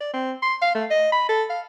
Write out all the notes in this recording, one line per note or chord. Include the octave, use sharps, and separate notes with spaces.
D5
C4
C6
F5
A3
D#5
B5
A4
F5